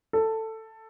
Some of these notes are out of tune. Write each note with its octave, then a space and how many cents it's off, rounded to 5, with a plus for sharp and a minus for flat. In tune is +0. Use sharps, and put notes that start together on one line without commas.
A4 +10